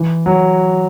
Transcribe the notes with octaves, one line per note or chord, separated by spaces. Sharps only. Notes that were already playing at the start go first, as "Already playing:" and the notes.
Already playing: E3
F#3